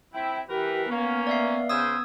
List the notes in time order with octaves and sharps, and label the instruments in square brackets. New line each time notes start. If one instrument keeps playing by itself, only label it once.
[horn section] C4 E4 [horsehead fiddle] G5
[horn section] E3 A#4 B4 [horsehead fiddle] G4
[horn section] A#3 C#4 [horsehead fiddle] B3
[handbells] D5 E5 F5
[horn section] C#3 C5 [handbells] D#6 E6 G#6